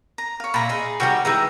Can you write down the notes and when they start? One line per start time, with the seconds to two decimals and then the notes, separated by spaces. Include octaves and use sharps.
0.18 A#5
0.40 C#5 F5
0.54 A#2 E5 A#5 B5
0.69 D#4 G#4
1.00 D3 D#3 G3 F#4 C#5 G5
1.25 D#3 E3 G#3 A#5